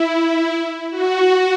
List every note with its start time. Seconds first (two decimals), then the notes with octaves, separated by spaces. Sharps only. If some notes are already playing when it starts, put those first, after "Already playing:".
Already playing: E4
0.91 F#4